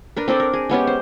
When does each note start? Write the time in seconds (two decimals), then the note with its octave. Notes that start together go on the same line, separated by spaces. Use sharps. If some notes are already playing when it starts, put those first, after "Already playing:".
0.17 D4 A#4 B4
0.28 C4 D4 A4 D5
0.40 A#4
0.53 G#4
0.69 G#3 B3 C#4 G4
0.87 C5